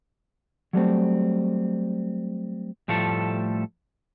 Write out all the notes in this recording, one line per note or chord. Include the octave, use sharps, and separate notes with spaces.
F#3 G3 A3 C4
A2 F3 G3 A3 A4